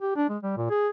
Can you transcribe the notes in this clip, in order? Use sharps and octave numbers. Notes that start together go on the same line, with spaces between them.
G4
D4
G#3
G3
A#2
G#4